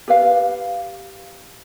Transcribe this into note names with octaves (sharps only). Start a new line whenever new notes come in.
G4 B4 F5